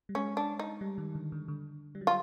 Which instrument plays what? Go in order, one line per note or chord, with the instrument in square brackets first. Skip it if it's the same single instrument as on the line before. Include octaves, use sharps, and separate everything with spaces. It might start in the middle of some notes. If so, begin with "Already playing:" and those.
[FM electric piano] G3
[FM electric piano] G#3 [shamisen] C#4
[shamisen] D4
D#4
[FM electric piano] G3
D#3
D3
D3
D3
G3
F#3
[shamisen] F4